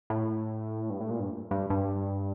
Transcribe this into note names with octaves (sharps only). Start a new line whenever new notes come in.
A2
G2
A2
A#2
G2
G2
G2